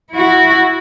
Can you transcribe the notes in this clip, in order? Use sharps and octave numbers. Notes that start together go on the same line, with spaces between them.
E4 F#4